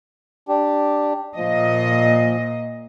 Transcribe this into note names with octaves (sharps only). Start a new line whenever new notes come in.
D4 G4
A#2 F3 D#5